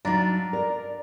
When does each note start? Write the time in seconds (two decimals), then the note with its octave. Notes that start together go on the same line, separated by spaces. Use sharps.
0.05 F#3 D4 D#4 F4 A#5
0.53 A#4 D5